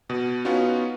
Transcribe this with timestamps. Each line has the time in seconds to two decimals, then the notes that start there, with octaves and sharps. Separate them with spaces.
0.10 B2
0.45 B3 C#4 D#4 F4 F#4